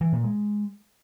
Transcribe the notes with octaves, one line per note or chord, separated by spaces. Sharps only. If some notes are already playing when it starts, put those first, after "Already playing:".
E3
A#2
G#3